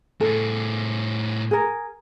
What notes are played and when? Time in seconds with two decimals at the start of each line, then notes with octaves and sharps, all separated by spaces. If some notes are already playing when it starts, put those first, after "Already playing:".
0.21 A2 G#4 A4
1.51 G#4 A#4